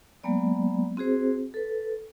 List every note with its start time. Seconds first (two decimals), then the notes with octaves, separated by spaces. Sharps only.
0.23 F#3 G#3 A#3 B3 D5
0.97 C4 F#4 G#4 C5
1.54 A4 B4